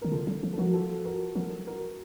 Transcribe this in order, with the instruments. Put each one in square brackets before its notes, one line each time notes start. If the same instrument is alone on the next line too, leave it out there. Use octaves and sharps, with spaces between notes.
[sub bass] D#3 [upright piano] A#4
[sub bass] C#3 [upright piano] F4 A4
[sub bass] F#3
F3
[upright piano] A4
[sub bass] F3 [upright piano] F#4 A#4
[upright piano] F4 A4
F#4 A#4
[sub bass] F3 [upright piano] F#4 A#4
[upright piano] F#4 A#4